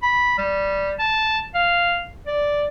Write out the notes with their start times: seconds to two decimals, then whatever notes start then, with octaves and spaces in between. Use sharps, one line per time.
0.03 B5
0.38 G3
0.99 A5
1.55 F5
2.27 D5